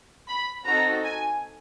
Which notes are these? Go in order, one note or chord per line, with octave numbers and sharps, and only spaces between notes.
B5
C4 D#4 F#4 A4 A#5
G#5